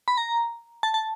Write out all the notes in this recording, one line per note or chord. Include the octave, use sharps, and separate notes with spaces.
B5
A#5
A5
A5